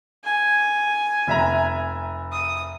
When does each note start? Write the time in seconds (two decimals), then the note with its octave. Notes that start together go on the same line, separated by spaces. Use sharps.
0.25 G#5
1.27 F1 E5 A#5
2.32 D#6